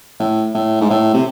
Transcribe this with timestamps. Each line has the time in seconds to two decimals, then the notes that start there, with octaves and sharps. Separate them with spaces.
0.20 A2
0.55 A2
0.81 G#2
0.90 A2
1.14 C3